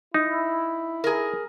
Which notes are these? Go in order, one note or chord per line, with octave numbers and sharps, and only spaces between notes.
D#4 E4
G#4 A#4